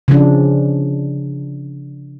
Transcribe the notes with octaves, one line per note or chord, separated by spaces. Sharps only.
C#3 F3 D4